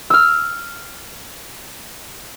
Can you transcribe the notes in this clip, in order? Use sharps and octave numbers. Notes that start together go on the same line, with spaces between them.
E6 F6